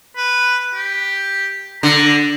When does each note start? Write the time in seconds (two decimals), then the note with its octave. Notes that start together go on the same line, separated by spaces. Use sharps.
0.17 B4
0.74 G4
1.83 D3 A#5